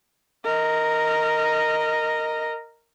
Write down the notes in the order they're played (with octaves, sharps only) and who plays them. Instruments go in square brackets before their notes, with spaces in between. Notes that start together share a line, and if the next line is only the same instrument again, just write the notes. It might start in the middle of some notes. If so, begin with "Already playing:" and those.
[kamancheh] A#4 D#5